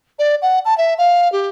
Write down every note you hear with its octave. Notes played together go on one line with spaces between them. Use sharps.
D5
F#5
A5
E5
F5
G4